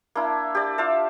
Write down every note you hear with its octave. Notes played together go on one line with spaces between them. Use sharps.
A#3 D4 E4
G4 D5
F4 E5 F5 A5